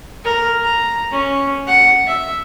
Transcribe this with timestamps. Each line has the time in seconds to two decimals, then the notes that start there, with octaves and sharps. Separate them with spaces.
0.24 A#4
0.63 A#5
1.12 C#4
1.67 F#5
2.07 E5